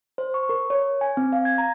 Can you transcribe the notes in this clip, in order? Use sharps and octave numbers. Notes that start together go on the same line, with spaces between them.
C5
C#6
A#4
C#5
G#5
C4
F5
G#6
A#5